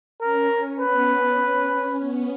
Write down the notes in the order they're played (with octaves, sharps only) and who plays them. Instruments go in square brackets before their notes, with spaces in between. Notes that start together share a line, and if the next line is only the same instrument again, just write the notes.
[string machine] C#4 [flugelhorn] A#4
[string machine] C#4
[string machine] B3 [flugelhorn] B4
[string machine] C#4
C#4
B3